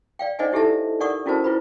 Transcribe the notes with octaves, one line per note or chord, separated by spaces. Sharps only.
D5 F5 G5
D#4 C5 D5 D#5 F#5 G#5
D#4 E4 G4 A4 E5 A5
D#4 A#4 D5 F#5 C#6 D#6
C#4 E4 F#4 A#4 C5 A5
E4 F4 B4 C5 B5